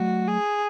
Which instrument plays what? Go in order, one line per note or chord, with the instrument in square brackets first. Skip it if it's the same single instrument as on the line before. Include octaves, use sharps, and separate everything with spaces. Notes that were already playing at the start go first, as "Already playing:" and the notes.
Already playing: [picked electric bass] F#3 A3 [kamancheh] F#4
[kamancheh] G#4